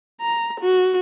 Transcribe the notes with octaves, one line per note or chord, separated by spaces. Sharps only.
A#5
F#4